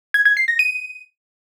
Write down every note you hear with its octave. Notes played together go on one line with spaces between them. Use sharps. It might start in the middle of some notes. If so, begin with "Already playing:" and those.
G#6
G#6
C7
A#6
D#7